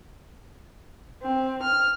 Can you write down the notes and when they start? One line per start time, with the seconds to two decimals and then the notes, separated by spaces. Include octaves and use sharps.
1.22 C4
1.62 F6